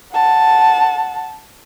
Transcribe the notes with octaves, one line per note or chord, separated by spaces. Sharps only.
F#5 A5